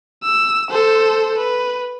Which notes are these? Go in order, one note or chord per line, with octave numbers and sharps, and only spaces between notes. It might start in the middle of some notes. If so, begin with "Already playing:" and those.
E6
A4 C5
B4